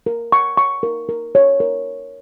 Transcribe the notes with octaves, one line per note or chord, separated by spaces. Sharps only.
A#4
C#6
C#6
A#4
A#4
C#5
A#4